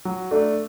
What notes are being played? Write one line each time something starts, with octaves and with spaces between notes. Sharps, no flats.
F#3
A3 D4